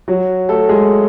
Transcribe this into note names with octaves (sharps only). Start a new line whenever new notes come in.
F#3 F#4
A3 A4
G#3 G#4